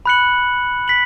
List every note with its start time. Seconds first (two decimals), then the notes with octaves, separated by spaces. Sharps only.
0.06 B5 F#6 C#7 F#7
0.88 B6 F#7